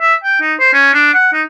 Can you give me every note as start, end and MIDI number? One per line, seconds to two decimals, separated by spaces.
0.01 0.15 76
0.24 0.41 79
0.41 0.54 63
0.60 0.72 72
0.73 0.93 61
0.94 1.09 62
1.14 1.29 78
1.33 1.42 63